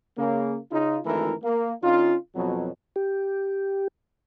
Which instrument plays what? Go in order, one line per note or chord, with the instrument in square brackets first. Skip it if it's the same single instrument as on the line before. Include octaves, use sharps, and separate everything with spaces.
[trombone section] C#3 A#3
C#3 D#4 F4
G#1 D2 E3 A3 E4 A#4
A#3
D3 C#4 D#4 F4
F2 B2 F#3
[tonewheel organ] G4